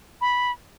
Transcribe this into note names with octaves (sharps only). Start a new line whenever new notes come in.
B5